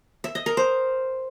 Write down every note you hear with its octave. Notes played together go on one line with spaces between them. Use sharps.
E5
D#5
A#4
C5